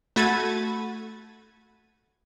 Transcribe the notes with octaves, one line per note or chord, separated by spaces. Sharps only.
A3 F#4 B5 G#6 A6 D#7